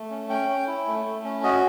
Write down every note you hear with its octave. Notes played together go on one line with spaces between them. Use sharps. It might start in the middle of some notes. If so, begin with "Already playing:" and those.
Already playing: A3
C#4
C#4 G5
C#4
E4
A3
A3
C#4
F#4 D#5